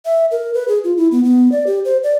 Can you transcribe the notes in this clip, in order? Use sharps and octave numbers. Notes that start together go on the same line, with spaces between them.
E5
A#4
B4
G#4
F4
E4
B3
B3
D5
G4
C5
D5